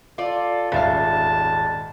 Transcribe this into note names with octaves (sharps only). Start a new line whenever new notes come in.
F4 A4 D5
D#1 G#1 C#3 E5 F5 A5 A6